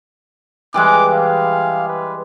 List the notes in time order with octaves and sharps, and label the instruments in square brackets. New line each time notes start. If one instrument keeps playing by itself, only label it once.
[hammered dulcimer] E3 G3 G#3 [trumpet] D6
[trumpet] F5
B4